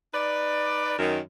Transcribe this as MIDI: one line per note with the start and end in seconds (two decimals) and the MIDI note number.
0.13 0.94 63
0.13 0.94 71
0.13 0.94 74
0.99 1.19 42
0.99 1.19 51